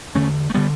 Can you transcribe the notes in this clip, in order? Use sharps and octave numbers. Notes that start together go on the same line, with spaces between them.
E2 D3 A3 C#4
A3
D3 G3 B3